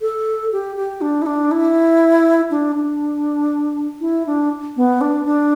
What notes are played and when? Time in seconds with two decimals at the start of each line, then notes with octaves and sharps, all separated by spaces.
0.01 A4
0.52 G4
0.76 G4
1.01 D4
1.22 E4
1.26 D4
1.51 E4
2.51 D4
2.76 D4
4.01 E4
4.27 D4
4.76 B3
5.01 D4
5.25 D4